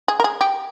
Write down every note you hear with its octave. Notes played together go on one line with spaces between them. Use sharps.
G#4
A#4
G#4
G4